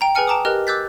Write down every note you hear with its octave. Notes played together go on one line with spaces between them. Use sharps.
G5 A#5
G#4 B4 G5 G#5 F6 C#7
G5 A5 A#5 D6 D#6
G4 A#4 B4 D#5 F6 F#6
D6 E6 F#6 G6 A6 B6